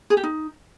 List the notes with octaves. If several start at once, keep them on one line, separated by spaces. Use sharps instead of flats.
G#4
G4
D#4